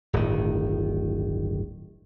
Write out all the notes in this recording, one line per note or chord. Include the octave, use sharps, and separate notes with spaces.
D1 G1 A2 D#3